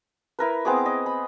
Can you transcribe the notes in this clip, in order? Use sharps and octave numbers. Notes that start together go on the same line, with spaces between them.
E4 A#4 B4
B3 C4 G#4 D6
D#5
B5